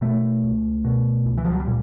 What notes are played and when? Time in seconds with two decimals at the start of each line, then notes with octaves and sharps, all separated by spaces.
0.01 B2 A3
0.44 C#2
0.84 B2
1.26 C#2
1.37 E3
1.45 F3
1.52 F#3
1.60 G3
1.67 A#2